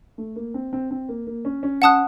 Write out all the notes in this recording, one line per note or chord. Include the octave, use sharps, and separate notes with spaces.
A3
A#3
C4
C4
C4
A#3
A#3
C#4
C#4
C#4 F#5 A5 D#6 F#6